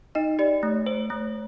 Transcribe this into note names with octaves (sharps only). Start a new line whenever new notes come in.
D#4 D#5
G4 D5
A3
C5
A3